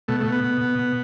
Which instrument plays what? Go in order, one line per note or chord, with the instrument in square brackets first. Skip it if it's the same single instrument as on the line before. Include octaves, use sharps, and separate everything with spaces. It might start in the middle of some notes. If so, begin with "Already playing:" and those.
[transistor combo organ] B2 A3
A3
B2
B3
B2
B2
B2